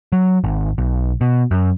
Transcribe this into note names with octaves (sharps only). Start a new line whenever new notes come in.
F#3
G#1
B1
B2
F#2